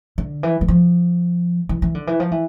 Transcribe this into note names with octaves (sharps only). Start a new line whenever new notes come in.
D3
E3
E3
F3
E3
E3
D3
E3
F3
E3